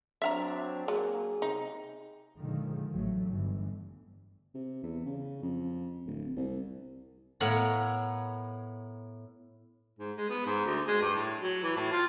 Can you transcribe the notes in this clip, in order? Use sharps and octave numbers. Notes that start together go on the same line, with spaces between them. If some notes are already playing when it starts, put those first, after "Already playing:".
F#3 C4 D4 E5 F5 A#5
F#3 A#3 G#4
C3 D#4
A#2 D3 D#3 F3 G#3
A1 F#3 A3
G1 E3
C3
E2
C#3
F2
D1
C2
A2 B3 A#4 C#5 F5 A#5
G#2
G#3
B3
G#2
D2
G#3
G2
A2
F#3
E3
A2
F4